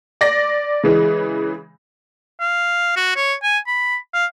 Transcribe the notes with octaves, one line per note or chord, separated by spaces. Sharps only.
D5 A#6
C#3 E3 G#3
F5
F#4
C#5
G#5
B5
F5